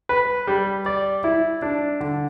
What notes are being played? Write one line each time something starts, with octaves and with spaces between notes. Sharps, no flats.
B4
G3
D5
E4
D4
D3